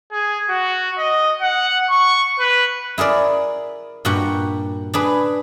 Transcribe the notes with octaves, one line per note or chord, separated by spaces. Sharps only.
G#4
F#4
D#5
F#5
C#6
B4
E4 G#4 A#4 D5
G2 A#2 F#4 G4 F#5
D4 G#4 B4